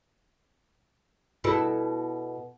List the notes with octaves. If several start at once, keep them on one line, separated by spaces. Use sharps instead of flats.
B2 E4 A4